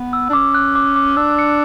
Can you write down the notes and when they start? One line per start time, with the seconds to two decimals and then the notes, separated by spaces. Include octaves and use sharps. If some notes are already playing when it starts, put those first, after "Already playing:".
Already playing: B3
0.13 E6
0.29 D4
0.33 C#4 D6
0.54 F#6
0.75 D6
0.96 D6
1.17 D4 E6
1.39 C#7